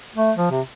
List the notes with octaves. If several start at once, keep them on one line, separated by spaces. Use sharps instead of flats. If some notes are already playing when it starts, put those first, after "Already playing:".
A3
F3
C3